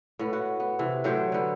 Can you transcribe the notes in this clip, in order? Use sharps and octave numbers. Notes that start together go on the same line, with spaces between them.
A2 B3
F#4
B3
C3 E3
A2 F#3 G4 C5
D3 B3